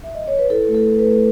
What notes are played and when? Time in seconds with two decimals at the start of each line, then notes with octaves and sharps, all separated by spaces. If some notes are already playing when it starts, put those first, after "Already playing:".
0.04 E5
0.15 D#5
0.28 C#5
0.39 B4
0.50 E4 A4
0.68 A3
0.74 A4
0.86 E4
0.99 B4
1.06 A3